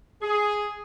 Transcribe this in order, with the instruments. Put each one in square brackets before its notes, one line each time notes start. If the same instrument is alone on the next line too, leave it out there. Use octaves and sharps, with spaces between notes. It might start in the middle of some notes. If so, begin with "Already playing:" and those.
[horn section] G#4